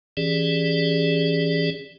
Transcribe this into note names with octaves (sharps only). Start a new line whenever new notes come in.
E3 C#4 G4 G#4 D5